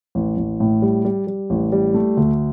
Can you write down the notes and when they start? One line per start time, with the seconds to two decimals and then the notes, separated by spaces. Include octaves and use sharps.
0.15 A1
0.37 A1
0.60 A2
0.82 G3
1.05 G3
1.27 G3
1.50 A1
1.72 G3
1.94 A3
2.17 D2